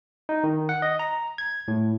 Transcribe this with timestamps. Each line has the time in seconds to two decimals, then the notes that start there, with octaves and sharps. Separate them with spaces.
0.29 D#4
0.44 D#3
0.69 F#5
0.82 D#5
0.99 A#5
1.38 G#6
1.68 A2